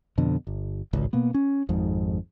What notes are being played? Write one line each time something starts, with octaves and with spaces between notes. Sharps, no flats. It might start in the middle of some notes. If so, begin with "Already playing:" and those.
F2 B2 D3
G1
D1 G#1 C#2
B2 A#3 B3
C#4
G#1 F2 G#2